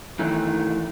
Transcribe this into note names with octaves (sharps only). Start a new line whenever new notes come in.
D#3 E3 A3